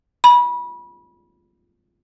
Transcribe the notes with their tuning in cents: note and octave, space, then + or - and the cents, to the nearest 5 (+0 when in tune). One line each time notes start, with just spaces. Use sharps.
B5 -25